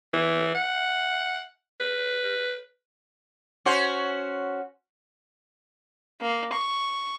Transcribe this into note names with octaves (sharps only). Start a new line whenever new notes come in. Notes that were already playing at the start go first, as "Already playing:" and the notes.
E3
F#5
B4
C#4 F#4 C5
A#3
C#6